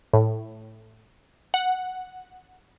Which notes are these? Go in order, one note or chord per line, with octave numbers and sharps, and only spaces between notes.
A2
F#5